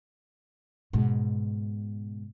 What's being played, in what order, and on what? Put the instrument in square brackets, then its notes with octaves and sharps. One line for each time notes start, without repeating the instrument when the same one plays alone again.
[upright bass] G#2 B2